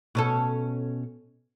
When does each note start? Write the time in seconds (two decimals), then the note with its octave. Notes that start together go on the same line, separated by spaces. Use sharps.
0.15 B2 C#4 A4